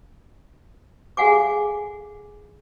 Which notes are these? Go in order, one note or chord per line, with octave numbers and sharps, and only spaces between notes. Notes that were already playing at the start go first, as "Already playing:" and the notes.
G#4 A4 F5 F#5 G#5 D6